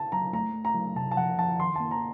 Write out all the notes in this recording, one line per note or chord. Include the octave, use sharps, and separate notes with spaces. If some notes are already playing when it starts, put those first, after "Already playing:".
Already playing: A5
F#3 A#5
A3 A#5
A3
A#5
F#3
C3 A5
A5
F3 F#5
F3 A5
D#3 C6
A#3 A5
A#5